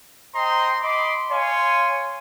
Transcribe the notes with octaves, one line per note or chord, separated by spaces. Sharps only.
C5 D#5 G5 A#5 C6
D#5 B5 C6 D6
C#5 F5 G#5 C6